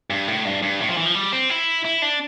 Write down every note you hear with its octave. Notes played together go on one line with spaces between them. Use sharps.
G2
A2
G2
G2
A2
F3
E3
F3
G3
C4
E4
E4
D4